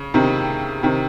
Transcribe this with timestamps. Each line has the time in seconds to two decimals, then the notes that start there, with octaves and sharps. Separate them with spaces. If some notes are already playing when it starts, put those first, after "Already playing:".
Already playing: C#3
0.14 C3 D#3
0.83 C3 D#3